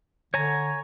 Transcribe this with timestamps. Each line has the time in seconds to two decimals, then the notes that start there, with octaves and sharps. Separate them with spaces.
0.34 D3 C#5 G#5 A#5